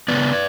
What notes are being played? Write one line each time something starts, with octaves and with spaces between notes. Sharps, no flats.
C#3 E3 B3 B4 D5